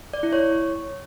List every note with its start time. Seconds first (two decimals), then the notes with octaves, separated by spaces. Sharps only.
0.13 D5
0.23 E4
0.33 C#5